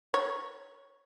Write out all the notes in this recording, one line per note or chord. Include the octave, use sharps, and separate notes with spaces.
C#5